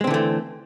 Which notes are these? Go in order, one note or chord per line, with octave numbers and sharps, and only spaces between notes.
D3 E3 G#3 A3 C4